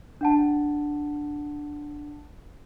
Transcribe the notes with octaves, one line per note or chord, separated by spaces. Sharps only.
D4 F#5 A5